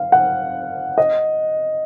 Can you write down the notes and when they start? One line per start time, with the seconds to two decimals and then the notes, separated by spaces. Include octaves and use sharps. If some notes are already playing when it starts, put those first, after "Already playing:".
Already playing: F5
0.12 F#5
0.98 D#5